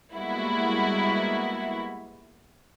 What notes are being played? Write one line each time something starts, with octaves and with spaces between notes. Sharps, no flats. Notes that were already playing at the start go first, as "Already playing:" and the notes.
G3 G#3 A#3 B3 E4 F#4